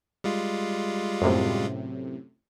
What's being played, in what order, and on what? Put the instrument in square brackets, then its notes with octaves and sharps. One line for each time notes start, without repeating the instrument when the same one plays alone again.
[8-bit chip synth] G3 G#3 F4
[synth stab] F#2 A2 C3